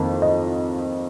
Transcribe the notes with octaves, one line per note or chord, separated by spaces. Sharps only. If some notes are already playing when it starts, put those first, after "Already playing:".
Already playing: F2 D#3 A#3 D#4
D#5